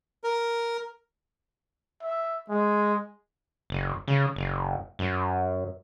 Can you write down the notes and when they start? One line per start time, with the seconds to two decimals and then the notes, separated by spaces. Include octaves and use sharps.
0.24 A#4
2.03 E5
2.49 G#3
3.70 F#1
4.08 C#3
4.36 F#1
4.99 F#2